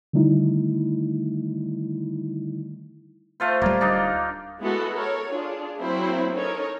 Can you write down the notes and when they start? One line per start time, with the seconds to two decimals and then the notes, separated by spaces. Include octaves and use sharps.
0.13 D3 D#3 G3 A3 D#4 E4
3.40 A3 F4 C5
3.62 D1 G3 A#3
3.81 D4 D#4
4.60 G#3 B3 E4 F#4 A4 F#5
4.93 A4 A#4 C#5
5.30 D4 F4 G#4
5.79 F#3 A#3 C4 E4 C5
6.34 C#4 D#4 A4 A#4 C#5